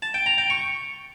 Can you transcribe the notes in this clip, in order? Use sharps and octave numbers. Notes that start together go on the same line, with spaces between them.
A5
G5
A#5
G5
C#6